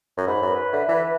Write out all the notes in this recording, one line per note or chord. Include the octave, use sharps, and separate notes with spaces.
F#2
G#2 B5
F#2
B4
D3 E5
E3 B4